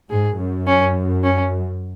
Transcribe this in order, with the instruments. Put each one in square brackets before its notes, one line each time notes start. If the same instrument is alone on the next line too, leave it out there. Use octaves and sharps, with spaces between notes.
[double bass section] G#2 [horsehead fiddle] G#4
[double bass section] F#2
[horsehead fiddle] C#4
C#4